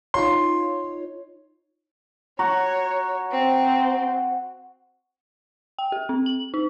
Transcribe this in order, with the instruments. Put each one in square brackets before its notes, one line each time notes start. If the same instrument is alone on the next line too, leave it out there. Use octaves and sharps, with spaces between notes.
[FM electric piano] D#4 F4 C#5 [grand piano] C6
[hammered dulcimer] F#4 [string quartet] C#5 [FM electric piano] A#5
[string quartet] C4
[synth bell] G5
G4
C4
F#7
D#4